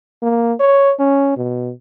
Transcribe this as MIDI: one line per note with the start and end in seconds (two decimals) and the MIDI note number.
0.22 0.53 58
0.60 0.94 73
1.00 1.36 61
1.37 1.72 47